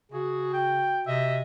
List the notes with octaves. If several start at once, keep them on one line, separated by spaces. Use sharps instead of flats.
C#3 F#4 G#4
G5
C3 D#5 E5